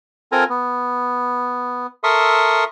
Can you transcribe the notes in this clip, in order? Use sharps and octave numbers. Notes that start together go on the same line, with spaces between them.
C4 F4 A4 A#4 G#5 A#5
B3
A4 A#4 E5 C6 C#6 D#6